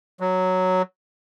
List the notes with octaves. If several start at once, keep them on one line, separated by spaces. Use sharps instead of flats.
F#3